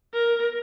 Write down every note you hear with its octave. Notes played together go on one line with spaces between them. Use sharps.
A#4